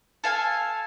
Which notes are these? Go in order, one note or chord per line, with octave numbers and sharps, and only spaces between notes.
A4 F5 G#5